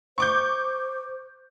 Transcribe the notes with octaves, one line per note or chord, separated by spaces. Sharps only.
C5 C#6 D6 G6